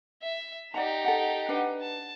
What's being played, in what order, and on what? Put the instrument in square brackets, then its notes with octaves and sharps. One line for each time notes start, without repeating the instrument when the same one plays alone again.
[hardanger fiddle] E5
[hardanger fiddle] D#4 G4 [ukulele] D5 F#5 A#5
[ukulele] A4 F#5
D4 B4 F#5
[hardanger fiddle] A5